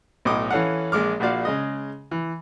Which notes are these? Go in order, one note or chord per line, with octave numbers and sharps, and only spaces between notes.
B1 A2 F#3 D#5 D6
E3 C#4 A4 F5 F#5
A#1 G#3 D6 F6
A#1 A#2 F#4 D5 F5
C#3 G#3 D#5
E3